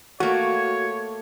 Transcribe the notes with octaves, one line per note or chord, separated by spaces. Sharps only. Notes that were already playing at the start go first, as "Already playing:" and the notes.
A3 A#3 F#4 C#5